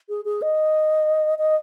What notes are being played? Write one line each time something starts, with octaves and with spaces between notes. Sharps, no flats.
G#4
G#4
D#5
D#5